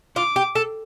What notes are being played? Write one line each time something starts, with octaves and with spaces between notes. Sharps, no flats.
F4 D6
G4
A4